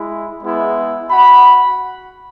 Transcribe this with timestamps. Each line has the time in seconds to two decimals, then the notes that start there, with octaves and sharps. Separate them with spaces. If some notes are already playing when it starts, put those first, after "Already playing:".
Already playing: G#3 E4
0.43 G#3 B3 E4
1.11 F#4 F#5 B5